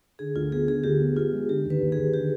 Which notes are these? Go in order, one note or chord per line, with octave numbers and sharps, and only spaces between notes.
D3 G#4
D2 F4
B3 G#4
D3 G#4
D2 G4
B3
B3 F4
G#3
D3 G4
D#2
B4
D#2
G#4
D#2
D3 G4